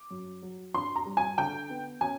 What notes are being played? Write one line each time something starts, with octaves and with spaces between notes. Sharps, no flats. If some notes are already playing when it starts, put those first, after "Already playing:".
Already playing: D6
F#2
F#3
D4 C6
A#5
G3
G#5
D3 G5
B3
C#4 G#5